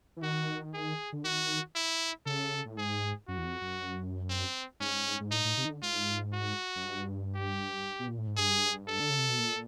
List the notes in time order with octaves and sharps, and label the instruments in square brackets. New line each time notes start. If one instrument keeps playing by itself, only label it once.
[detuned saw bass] E3
[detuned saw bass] D#3 [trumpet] F#4
[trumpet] G#4
[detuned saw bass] D3
[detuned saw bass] D#3 [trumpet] F#4
[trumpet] E4
[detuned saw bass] C#3 [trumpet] A4
[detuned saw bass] A2
[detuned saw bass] G#2 [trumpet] G#4
[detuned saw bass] F#2 [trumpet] F#4
[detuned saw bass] E2
F2
F#2
[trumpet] C4
[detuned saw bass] G#2 [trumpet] C#4
[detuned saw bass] G#2
[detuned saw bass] A2 [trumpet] D#4
[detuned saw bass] A2
C3
D#3
D3
[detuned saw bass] G#2 [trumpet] F4
[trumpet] F#4
[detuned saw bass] F#2
G2
[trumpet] G4
[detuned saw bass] B2
A#2
A2
G#2
[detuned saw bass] G2 [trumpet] G#4
[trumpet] A4
[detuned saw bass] D3
C#3
C3
B2
A#2